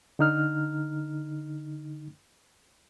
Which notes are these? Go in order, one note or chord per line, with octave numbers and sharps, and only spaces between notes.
D3 D#4 F6